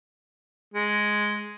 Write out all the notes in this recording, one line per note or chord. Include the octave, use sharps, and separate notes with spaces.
G#3